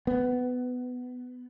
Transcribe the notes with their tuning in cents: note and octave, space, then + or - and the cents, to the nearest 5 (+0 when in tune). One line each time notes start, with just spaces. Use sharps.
B3 +15